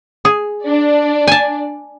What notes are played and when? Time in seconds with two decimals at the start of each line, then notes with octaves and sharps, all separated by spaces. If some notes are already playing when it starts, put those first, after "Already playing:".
0.25 G#4
0.65 D4 D5
1.27 G#5 A5